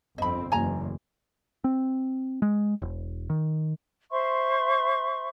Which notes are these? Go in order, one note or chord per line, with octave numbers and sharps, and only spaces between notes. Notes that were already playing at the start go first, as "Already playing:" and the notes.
G1 F2 C4 D#5 B5
F#1 E2 G#5 A#5
C4
G#3
E1
D#3
C5 E5 C6 C#6